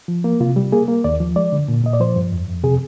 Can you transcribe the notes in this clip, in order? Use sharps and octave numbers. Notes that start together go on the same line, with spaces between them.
F3
A#3
C3 F4
G3
A#3 G#4
A#3
D#2 D5
F3
G#3 D5
D3
A#2
A#2 D#5
D5
F3 C5
G2
F2
F2
C3 G#4